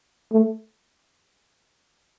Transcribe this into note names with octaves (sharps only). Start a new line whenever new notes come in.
A3